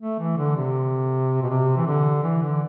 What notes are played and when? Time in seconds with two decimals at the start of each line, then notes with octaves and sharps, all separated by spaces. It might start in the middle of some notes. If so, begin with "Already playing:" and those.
0.01 A3
0.19 E3
0.37 D3
0.57 C3
1.42 B2
1.50 C3
1.77 E3
1.86 D3
2.23 E3
2.42 D3